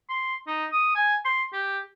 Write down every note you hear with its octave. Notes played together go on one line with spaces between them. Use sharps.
C6
D#4
D#6
G#5
C6
G4